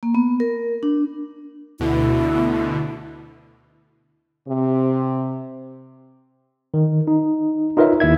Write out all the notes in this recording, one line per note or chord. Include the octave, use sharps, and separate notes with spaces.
A#3
B3
A#4
D4
D2 B2 D3 E4
C3
D#3
D#4
D#4 F4 A#4 B4 C#5 E5
D#2 E4 E5 G#6